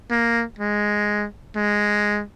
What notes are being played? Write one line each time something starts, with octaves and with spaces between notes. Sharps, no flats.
A#3
G#3
G#3